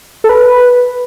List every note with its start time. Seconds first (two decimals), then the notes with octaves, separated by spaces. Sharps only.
0.24 A4
0.29 B4